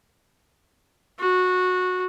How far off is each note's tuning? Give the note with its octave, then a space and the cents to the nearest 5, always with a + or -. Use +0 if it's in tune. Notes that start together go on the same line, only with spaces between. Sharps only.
F#4 -15